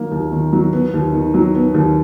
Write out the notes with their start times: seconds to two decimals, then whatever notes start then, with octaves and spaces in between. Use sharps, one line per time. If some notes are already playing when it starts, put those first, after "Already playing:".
Already playing: D#3 F#3 A#3
0.11 D#2
0.32 D#3
0.53 F#3
0.73 B3
0.94 D#2
1.13 D#3
1.34 F#3
1.55 B3
1.74 D#2